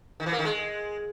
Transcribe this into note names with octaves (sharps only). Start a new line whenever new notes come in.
D#3
E3
A#3
D#3
G#3